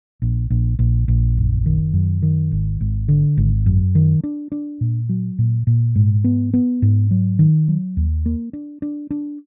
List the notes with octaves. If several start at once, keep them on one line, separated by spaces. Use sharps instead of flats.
A#1
A#1
A#1
A#1
F#1
D#3
F#2
D#3
G#1
G#1
D3
G#1
F#2
D#3
D4
D4
A#2
F#3
A#2
A#2
G#2
B3
B3
G#2
F#3
D#3
F#3
D#2
A#3
D4
D4
D4